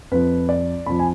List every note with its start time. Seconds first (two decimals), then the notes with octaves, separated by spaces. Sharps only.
0.11 F2 F3 B4
0.49 D5
0.86 F2 F3 B5
0.99 G#5